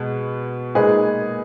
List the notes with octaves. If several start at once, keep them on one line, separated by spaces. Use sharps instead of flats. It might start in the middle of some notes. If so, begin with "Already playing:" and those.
Already playing: B2 G#3 B3
A#2 G#3 D#4 G#4 B4